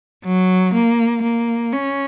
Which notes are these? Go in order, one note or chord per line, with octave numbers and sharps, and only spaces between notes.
F#3
A#3
A#3
C#4